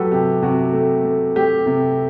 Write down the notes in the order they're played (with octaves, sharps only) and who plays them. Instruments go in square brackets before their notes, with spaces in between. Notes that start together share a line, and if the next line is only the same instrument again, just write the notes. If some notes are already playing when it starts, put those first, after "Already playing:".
Already playing: [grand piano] F#3 A3 F#4 G4 A4 B4
C3 G4
C3 F#4
A3
A3
A3 G4
C3